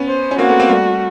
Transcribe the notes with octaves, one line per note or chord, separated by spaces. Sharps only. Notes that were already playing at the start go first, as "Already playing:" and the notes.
Already playing: B3 C#4
C5
C#4
A#3 C4 F#4
A3 B3
A#3 C4
G3 A3